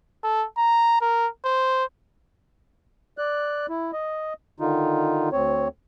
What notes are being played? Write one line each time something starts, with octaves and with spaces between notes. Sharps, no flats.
A4
A#5
A#4
C5
D5 F#6
E4
D#5
D3 D#3 D#4 F4
D2 C4 C#5